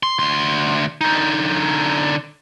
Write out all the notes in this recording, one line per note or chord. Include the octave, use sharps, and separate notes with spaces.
C6
D2 C6
D3 D#4